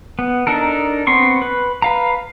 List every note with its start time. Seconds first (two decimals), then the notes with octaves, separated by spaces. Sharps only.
0.19 B3
0.47 D4 D#4 A4 A#4
1.07 B3 C4 C6 C#6
1.42 B4
1.82 B4 F5 A#5